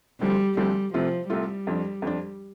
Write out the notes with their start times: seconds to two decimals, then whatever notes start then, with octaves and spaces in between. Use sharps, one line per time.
0.20 D2 D3 F3 G3 C4
0.57 D2 D3 F3 G3 C4
0.93 C2 C3 F3 A3 F4
1.30 C2 C3 G3 A3 F4
1.67 F2 F3 D4
2.02 F2 F3 D4